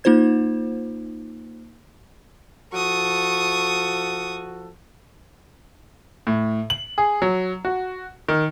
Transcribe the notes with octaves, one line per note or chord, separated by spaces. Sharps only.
A#3 D#4 F4 C5 G#6
F3 F#4 A4 C#6 D#6
A2
F#7
G#4
F#3
F#4
D#3